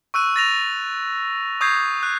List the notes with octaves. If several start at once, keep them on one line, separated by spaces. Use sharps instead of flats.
C#6 E6 F#6 D#7
A6 A#6 F7
C#6 D#6 G6 G#6 C7
F#6